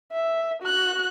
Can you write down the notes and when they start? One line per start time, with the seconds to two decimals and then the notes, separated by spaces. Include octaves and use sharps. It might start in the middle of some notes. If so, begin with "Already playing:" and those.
0.12 E5
0.63 F#4 F#6